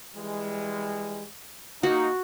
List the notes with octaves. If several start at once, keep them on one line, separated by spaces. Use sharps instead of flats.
E3 G3 G#3
A#3 D#4 F#4